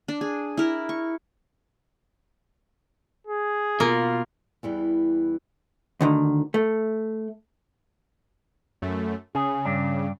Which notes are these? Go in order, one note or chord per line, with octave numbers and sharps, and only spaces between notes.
D4
G#4
E4 A#4
C#6
G#4
B2 A#3 F4
E2 E3 G3
D2 D3 D#3
A3
F#2 A3
C#3 G#4
G2 D4